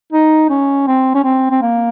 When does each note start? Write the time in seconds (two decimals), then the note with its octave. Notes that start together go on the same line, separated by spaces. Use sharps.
0.13 D#4
0.50 C#4
0.87 C4
1.15 C#4
1.24 C4
1.51 C4
1.62 A#3